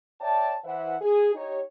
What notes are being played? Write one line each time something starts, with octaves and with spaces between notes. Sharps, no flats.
C#5 D5 E5 G5 A5
E3 C5 E5 F#5
G#4
D#4 G4 C#5